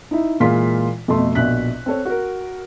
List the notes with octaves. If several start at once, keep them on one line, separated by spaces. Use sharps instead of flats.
D#4 E4
A#2 E3 G#3 F4 C6 B6
F2 B2 A3 C6
A#1 B2 E5 F#6 B6
C4 A4 C#5
F#4 A#4